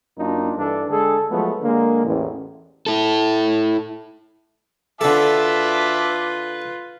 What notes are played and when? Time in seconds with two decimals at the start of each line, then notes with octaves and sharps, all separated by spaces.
0.18 F#2 A#3 D4 D#4 F4
0.57 G2 E3 D4 A4
0.89 D3 G#3 G#4 A4
1.29 F3 F#3 G#3 A3 B3
1.62 D3 G#3 A#3
2.05 A1 E2
2.86 E4 A4
5.01 D3 F4 A4 B4 E5 A5 D6